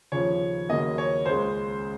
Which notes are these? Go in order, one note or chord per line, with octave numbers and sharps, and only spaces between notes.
D#2 C#3 F3 C#5
D#2 C#3 F#3 A#3 D#5
C#5
C#2 C#3 G#3 C5